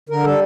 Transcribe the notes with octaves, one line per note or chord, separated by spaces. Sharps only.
D3 A#4
G3 A4